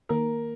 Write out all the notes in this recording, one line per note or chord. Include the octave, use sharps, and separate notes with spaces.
D#3 A#3 A#4